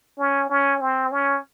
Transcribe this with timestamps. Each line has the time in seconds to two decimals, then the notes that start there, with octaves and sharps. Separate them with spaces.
0.19 C#4
0.50 C#4
0.81 C4
1.12 C#4